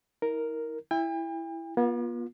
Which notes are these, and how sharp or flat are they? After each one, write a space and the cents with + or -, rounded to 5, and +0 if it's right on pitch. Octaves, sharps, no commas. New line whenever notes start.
E4 -45 A#4 +0
E4 +5 G5 +45
B3 -45 F4 +10